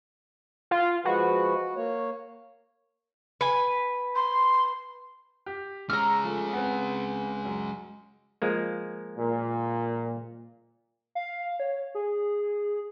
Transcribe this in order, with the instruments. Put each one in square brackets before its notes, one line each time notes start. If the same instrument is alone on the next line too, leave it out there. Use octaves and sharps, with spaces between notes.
[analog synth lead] F4
[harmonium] F3 G#3 B4 [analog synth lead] F#4
[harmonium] A#3 C#5
[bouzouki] B4 G#5
[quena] C6
[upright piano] G4
[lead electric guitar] G#3 C#4 [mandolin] A#5 F6 [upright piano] E6
[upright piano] F3 A3
B3 C4
F#2
[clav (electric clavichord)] F3 G#3 A#3
[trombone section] A#2
[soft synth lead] F5
C#5
G#4